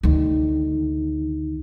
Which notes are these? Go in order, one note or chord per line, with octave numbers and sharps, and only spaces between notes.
D2 D#3